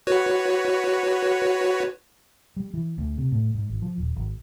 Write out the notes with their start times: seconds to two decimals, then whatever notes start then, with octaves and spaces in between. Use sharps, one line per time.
0.07 F#4 B4 C#5
2.57 G3
2.74 E3
2.98 D2
3.18 C3
3.32 A2
3.55 G#2
3.70 G#1
3.82 F3
3.98 D#1
4.16 G#1